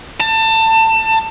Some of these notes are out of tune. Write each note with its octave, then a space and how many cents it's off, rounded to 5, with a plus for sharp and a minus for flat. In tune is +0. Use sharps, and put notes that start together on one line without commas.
A5 +25